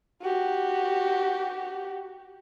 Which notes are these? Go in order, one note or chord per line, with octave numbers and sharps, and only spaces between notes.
F#4 G4